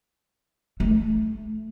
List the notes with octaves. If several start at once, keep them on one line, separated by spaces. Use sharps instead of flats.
A3